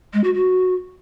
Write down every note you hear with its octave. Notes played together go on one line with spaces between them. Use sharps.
G#3
F#4
F#4